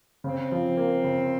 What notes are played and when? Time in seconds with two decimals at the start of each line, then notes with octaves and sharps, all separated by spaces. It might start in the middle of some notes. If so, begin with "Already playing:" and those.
0.24 C#3 C4
0.52 F3
0.77 A#3
1.04 C#3